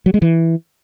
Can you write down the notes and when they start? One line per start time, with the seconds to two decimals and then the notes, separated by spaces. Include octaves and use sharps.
0.06 F#3
0.14 G#3
0.22 E3